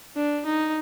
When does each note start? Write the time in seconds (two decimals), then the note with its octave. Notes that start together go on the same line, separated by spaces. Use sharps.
0.16 D4
0.45 D#4